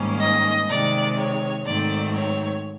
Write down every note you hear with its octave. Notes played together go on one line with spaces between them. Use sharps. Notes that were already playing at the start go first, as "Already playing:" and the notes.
Already playing: G#2 D#3 G3 A#3 C#4
D#5
C3 D#3 G#3 D5
C#5
G#2 D#3 F#3 A3 C4 D5
C#5